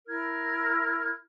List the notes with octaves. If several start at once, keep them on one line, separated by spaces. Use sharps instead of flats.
E4 A#4 F6 G#6